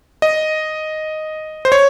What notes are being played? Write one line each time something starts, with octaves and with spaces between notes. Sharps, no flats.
D#5
C5
C#5